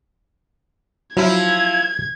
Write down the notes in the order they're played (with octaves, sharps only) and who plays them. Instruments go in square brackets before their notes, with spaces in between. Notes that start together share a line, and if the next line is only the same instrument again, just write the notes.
[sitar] F3 E4 [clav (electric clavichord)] F#3 [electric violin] G#6